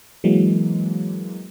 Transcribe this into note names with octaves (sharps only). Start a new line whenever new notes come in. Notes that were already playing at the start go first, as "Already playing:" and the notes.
E3 F#3 G#3 A#3